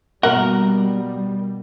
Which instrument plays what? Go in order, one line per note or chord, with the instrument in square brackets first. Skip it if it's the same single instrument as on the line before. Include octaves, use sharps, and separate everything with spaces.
[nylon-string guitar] B2 A#3 [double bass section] G3 [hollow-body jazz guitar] A#4 [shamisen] F#5